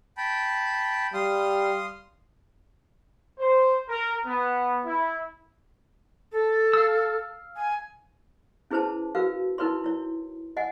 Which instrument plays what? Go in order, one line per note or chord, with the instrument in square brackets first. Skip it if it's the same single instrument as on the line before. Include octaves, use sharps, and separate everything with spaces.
[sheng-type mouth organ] G5 A5 B5
[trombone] G3 [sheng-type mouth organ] F5 C6 D#6
[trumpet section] C5
A#4
B3
E4
[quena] A4
[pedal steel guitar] F5 E6
[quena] G#5
[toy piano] C#4 E4 G#4 B4 C5 A5
F#4 A#4 B4 F5
D#4 E4 A#4 B4 C#5 C6
E4 C#5
D#5 F#5 G#5